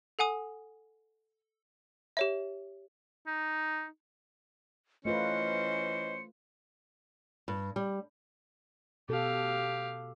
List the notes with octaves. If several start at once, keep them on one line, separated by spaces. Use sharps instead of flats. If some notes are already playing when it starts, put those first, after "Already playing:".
A4 F#5 G#5 D#6
G4 C#5 E5
D#4
E3 A3 C#4 F4 B4 C5 D#5 C#7
G2
G3
B2 G4 A4 F5